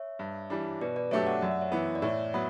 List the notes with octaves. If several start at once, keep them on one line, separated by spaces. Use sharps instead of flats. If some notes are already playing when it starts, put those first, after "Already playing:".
Already playing: C#5 E5
G2
E3 G3 D4
B2 B4 D5
B4 D5
F#3 A3 D4 G4 C#5 E5
D5 F#5
F#2 E5
F#5
C#5 E5
E3 B3
D5
A2 C#5 E5
F#3 B3